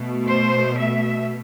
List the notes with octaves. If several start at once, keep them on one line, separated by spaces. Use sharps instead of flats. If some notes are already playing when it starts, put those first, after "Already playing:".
Already playing: B2 A3
C5
E5